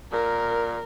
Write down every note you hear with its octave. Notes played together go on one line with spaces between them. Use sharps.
A#2 A#4